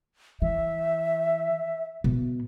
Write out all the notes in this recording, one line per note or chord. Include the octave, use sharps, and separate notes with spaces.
E3 E5
B2